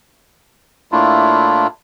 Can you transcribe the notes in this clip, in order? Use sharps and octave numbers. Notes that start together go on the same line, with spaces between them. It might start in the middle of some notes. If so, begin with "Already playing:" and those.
A2 A3 A#3 D4 E4 F4